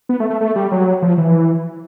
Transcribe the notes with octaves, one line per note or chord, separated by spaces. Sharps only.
B3
A3
A3
A3
G3
F#3
F3
E3